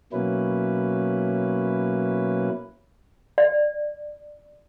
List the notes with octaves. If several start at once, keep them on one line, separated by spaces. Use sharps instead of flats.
B2 F#3 A#3 C#4 E4 B4
D5